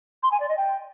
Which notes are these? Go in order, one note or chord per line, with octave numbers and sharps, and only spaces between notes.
C6
G#5
D5
D#5
G5